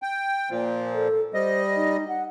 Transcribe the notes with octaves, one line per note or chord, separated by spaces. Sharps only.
G5
A#2 F3
A4
G3 C5 D#5
D#4
F#5